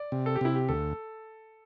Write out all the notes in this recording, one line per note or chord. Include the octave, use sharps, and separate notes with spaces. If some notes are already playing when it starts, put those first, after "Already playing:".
Already playing: D5
C3
A4
G4
C3 E4
G4
D2 A4